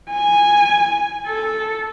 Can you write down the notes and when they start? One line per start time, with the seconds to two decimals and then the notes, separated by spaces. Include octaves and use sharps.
0.11 G#5
1.27 A4